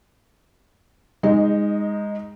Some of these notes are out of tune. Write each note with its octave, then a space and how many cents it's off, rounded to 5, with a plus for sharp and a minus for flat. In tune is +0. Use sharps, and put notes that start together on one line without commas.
G#3 -20 D#4 +5